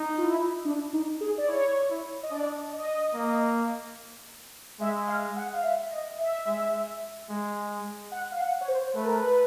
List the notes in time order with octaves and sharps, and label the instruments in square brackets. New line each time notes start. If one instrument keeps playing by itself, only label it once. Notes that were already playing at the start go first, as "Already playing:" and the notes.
Already playing: [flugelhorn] D#4
[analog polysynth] F4
E4
D4
D#4
G#4
D5
[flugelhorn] E4 [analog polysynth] C#5
[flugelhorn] E4
[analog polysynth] D#5
[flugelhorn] D4 [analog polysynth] D5
[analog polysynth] D#5
[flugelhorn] A#3
[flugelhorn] G#3 [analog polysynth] E5
[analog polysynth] F5
F#5
F5
E5
D#5
E5
[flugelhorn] G#3
G#3
[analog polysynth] F#5
F5
F#5
C#5
C5
[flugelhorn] A3 [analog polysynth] B4
[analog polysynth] A#4
B4